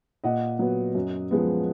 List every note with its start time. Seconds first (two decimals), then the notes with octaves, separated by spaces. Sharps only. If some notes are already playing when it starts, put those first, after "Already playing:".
0.24 A#2 D#5 F#5
0.59 F#3 B3
0.95 F#2
1.31 F3 G#3 B3